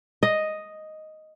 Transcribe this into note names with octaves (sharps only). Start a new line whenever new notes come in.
D#5